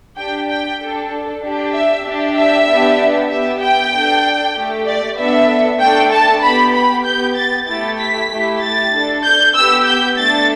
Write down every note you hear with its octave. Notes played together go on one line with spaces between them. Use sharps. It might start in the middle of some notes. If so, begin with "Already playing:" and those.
D4 G4 G5
G5
D4 A4
D4 G4
E5
D4 G4
E5
B3 D4 G4
B3 G4 E5
G5
D4 A4
A3 G4
D5
B3 D4 A4 E5
A3 D4 A4 G5
A5
B3 G4 B5
B5
B3 G4 G6
A6
A3 E4 G4 A6
B6
A3 E4 G4
A6
D4 A4
G6
B3 G4 E6
G6
A3 D4 A4 A6